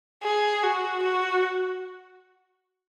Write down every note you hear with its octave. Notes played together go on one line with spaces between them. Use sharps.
G#4
F#4
F#4